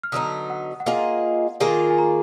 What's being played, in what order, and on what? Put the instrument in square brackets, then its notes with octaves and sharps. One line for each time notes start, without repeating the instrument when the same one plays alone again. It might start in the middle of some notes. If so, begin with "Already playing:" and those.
[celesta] F6
[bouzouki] D3 F#3 B3 D#4 [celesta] D#6
[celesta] F#5
F#5
[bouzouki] A#3 F4 G#4 D#5 [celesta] F5
[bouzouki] D#3 A#3 F4 G#4 [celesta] G#5
[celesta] G#5
A#5